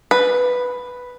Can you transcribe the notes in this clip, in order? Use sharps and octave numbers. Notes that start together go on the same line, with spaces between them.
B4